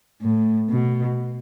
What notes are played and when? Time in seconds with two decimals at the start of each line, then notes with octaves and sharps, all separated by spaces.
0.22 A2
0.70 B2